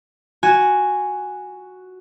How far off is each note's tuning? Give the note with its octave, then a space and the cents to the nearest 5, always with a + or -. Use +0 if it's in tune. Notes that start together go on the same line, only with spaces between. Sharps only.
F#4 +0 G#5 +0